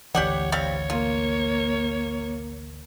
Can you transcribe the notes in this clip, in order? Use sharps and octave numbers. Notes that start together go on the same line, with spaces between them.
G#1 D2 E3 G4 C#5 D5 F#5
G3 C4 C#5 F5
A#3 F4